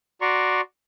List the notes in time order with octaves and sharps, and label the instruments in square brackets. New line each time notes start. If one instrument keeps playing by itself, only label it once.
[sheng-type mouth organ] F#4 D5 A#5 C6 C#6